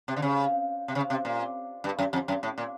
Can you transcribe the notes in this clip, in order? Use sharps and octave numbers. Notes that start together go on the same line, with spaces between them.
C3
D3
C#3
C3
C#3
C3
A#2
G2
F#2
F2
F#2
A2
A#2